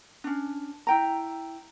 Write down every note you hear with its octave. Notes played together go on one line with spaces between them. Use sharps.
C#4 D4
E4 G5 A#5